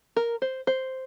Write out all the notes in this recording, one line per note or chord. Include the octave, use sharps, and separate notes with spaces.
A#4
C5
C5